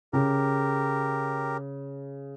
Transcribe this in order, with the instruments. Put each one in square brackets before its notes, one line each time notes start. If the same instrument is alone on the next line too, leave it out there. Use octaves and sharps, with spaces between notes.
[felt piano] C#3 [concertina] G4 A#4